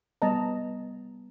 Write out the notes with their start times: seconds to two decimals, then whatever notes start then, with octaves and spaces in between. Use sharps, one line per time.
0.22 G3 B3 D#5 A5 A#5